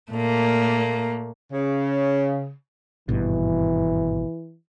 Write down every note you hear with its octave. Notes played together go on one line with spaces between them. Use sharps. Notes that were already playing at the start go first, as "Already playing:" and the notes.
A#2 A3 A#3
C#3
G#1 G2 B2 E3